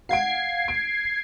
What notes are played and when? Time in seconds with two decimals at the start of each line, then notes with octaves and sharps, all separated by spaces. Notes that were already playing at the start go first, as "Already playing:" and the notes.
0.09 F5 F#5 G#6 C7 D7
0.68 D7